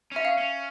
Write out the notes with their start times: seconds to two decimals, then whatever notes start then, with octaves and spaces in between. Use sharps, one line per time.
0.12 C#4 E5
0.25 F5
0.38 C#4